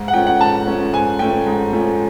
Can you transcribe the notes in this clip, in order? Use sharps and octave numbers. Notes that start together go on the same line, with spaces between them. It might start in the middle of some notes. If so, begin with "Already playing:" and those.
Already playing: G#2
F#5
F3 A3 C#4 G5
F#5
G#2 A5
F3 A3 C#4
G#2 G#5
F3 A3 C#4 G5
G#2
F3 A3 C#4